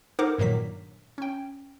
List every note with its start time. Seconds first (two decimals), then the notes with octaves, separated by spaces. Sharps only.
0.19 D#4 A4 A#4 C5 F#5 D6
0.38 G2 A#2 D#3 F#3 B6
1.18 C#4 G5